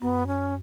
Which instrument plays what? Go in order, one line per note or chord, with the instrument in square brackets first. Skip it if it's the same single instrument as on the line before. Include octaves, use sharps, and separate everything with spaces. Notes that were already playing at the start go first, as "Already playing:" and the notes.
[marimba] F#2 [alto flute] B3
[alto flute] C#4